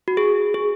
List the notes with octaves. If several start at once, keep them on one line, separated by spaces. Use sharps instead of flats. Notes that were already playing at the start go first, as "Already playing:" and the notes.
F#4
G#4
G#4